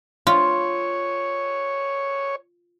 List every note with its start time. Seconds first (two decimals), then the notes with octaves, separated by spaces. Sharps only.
0.27 F4 C#5